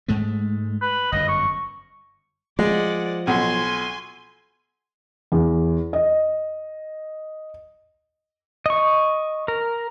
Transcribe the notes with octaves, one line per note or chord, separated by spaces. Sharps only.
G#2 G#3 A3
B4
G1 F#2 D#5
C#6
F3 G#3 D5 F#5
B1 G#5 C6
E2
D#5
D#5 C#6
A#4